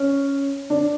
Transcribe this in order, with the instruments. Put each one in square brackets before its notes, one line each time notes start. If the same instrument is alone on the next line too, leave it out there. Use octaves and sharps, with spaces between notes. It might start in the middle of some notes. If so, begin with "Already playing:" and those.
Already playing: [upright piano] C#4
D4